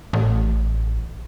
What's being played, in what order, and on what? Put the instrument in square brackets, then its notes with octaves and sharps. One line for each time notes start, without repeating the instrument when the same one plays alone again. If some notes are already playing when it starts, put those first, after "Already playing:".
[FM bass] A1